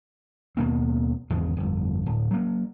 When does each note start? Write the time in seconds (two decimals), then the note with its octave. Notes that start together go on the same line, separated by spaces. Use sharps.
0.57 D#2 B2 A#3 C4
1.30 G#1 E2 C#3 G#3
1.57 G1 F2
2.06 D1
2.31 F#3 A#3